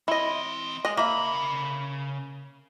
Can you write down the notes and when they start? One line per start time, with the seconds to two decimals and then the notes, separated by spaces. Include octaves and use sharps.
0.08 E3 C4 E4 D#5
0.85 G#3 D#5
0.97 C#3 A#3 E5 B5